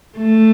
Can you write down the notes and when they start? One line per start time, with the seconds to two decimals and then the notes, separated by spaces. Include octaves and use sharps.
0.17 A3